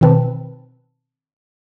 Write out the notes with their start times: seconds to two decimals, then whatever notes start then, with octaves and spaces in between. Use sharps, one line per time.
0.01 B2 D#3 C4 B4 A5